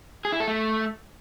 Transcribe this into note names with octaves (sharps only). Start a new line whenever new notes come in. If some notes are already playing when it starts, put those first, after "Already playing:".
G#4
E4
A4
A3